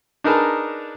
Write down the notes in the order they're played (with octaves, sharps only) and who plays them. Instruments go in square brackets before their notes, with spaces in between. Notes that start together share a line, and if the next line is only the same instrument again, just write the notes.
[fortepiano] D4 D#4 G#4 A#4 B4 A5